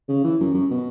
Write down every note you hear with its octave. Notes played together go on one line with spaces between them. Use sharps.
C#3
E3
F#2
F#2
B2